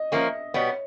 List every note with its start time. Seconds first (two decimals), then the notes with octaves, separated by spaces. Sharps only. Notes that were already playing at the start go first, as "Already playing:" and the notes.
Already playing: D#5
0.12 F3 A#3 C#4 E5
0.54 B2 G3 B3 C#5